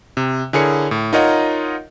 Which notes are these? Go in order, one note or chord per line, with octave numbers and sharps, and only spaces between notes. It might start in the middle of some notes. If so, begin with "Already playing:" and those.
C3
D3 E4 G#4 A#4 C#5 C#7
A2
D#4 F4 A#4 C#5 D#5 F#5